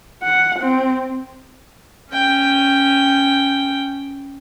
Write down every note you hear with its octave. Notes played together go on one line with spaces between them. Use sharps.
F#5
C4
C#4 G5